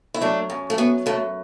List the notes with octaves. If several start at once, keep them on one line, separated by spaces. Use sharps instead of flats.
E4
F#3 A3 D4
F#2
A3
F#3 B3
F#2 A3